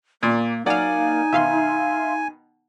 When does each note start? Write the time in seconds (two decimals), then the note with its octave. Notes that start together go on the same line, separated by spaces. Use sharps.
0.22 A#2 A#3 D5
0.66 F#3 A#3 D#4 D5 F5 F#5 G#5
1.33 B2 D#3 E5 F5 C6